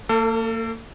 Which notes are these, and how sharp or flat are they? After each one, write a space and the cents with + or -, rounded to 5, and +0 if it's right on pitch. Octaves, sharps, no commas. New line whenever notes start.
A#3 -35 A4 +30